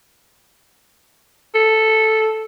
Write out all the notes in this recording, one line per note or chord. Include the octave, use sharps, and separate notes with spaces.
A4